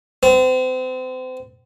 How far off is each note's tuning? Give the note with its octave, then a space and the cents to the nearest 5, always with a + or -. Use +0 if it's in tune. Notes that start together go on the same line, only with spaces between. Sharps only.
C4 -35